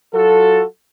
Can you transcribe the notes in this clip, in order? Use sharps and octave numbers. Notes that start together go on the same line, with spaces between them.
F#3 F4 F#4 A4